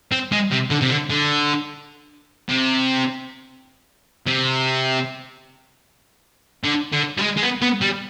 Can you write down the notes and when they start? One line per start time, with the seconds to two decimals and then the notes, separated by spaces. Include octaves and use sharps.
0.12 C4
0.32 G#3
0.52 C3
0.71 D3
0.82 C3
0.91 D3
1.11 D3
2.49 C3
4.26 C3
6.64 D3
6.93 D3
7.18 G3
7.22 G#3
7.37 G#3
7.42 B3
7.62 B3
7.82 G3